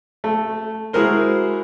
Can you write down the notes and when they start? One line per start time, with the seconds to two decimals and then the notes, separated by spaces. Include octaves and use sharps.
0.24 A3
0.93 G#3 E4 F#4 G#4 A#4 C5